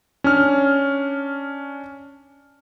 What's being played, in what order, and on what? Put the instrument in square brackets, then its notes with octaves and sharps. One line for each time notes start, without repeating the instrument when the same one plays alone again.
[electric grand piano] C#4 D4 F6